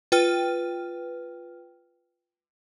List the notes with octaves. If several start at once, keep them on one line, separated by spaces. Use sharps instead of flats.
F4 B4 G5 F6